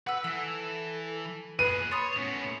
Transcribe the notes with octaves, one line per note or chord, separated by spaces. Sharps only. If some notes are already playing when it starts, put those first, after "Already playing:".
B4 F#5 E6
E3 A4 E6
A#2 G#4 B4 D#7
C#5 B5 C6 D#6 A6
A2 B3 C#4